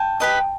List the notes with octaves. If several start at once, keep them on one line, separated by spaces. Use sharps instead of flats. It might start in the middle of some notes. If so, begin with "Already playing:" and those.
Already playing: G5 A5
G4 B4 D#5